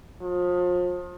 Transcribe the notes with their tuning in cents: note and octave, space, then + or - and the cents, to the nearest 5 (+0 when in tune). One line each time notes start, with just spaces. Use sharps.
F3 +35